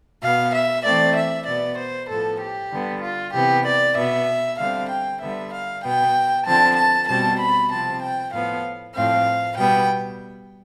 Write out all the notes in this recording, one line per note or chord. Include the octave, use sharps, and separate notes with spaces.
B2 B3 F5
E5
E3 A3 C4 D5
E5
B2 B3 D5
C5
A2 F3 B3 A4
G4
D3 G3 B3
F4
C3 E3 B3 G4
D5
B2 B3 E5
D3 G3 C4 F5
G5
D3 G3 B3 E5
F5
B2 B3 G5
D3 F3 C4 A5
A5
B2 G3 C4 A5
B5
C3 F3 C4 A5
G5
A2 F3 B3 F5
A2 F3 C4 F5
B2 G3 B3 G5